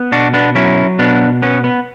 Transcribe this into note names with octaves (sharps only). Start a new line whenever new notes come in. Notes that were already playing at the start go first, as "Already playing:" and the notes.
Already playing: B3
B2 D4 F#4
B3 D4
F#3 C#4 E4
B2 B3 D4
B3 C#4
B3